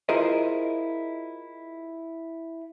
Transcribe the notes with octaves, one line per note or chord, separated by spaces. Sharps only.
E4 F4 G#4 A#4 C5 D#5